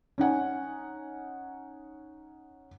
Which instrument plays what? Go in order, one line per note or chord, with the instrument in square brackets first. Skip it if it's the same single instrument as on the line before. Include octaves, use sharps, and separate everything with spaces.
[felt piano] C#4 D#4 F#5 G#5